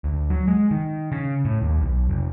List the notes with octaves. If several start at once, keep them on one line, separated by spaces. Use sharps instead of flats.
D2
F#3
G#3
D#3
C#3
A2
D#2
B1
F1